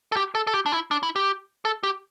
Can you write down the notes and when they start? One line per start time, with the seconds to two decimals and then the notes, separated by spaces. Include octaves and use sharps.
0.12 A4
0.16 G4
0.35 A4
0.47 A4
0.54 G4
0.66 D4
0.72 E4
0.91 D4
1.03 E4
1.16 G4
1.65 A4
1.83 G4